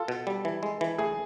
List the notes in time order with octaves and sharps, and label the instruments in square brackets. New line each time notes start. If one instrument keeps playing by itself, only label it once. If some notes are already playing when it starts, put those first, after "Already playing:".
Already playing: [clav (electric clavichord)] F4 [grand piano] A4
[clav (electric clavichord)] B2
G3
E3
G#3
E3
[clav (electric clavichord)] A3 [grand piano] G#4